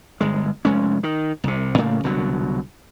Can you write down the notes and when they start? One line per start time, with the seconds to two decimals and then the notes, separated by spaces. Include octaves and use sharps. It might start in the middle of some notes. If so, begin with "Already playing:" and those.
0.21 G1 G#3
0.65 F1 G#3 C#4
1.03 D#3
1.44 C2 C3
1.78 A2 C#3 A3 A#3
2.04 C2 B2 D3 F#3